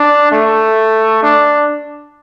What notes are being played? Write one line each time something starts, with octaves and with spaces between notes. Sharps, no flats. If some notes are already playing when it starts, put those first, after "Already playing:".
Already playing: D4
A3
D4